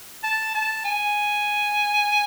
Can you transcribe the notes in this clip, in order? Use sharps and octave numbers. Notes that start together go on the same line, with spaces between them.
A5
A5
G#5